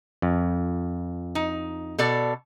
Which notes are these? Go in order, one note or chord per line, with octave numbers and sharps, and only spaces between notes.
F2
D#4
B2 A4 D5